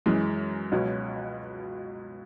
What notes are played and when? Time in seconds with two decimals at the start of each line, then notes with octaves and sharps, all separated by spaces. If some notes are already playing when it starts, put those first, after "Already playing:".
0.06 F#2 E3 G#3
0.72 C#2 B2 F#3 C#4